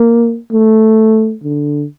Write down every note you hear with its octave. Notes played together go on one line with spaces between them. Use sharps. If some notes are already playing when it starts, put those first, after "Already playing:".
Already playing: A#3
A3
D3